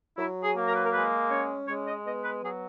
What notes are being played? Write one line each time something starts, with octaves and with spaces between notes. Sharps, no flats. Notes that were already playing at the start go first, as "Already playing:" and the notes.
F#3 E4
G#4
A#3
A#4
B4
A#4
G#3 B4
C#4 C#5
G#3 C#5
D#5
B3 D#5
B4
F#3 G#4